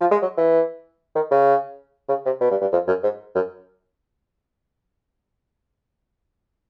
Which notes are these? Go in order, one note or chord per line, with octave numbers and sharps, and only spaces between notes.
F3
G#3
F#3
E3
D#3
C#3
C#3
C3
B2
G2
G2
F2
F#2
G#2
F#2